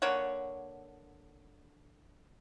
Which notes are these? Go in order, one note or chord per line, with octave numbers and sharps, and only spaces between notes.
D3 A#3 C#5 F#5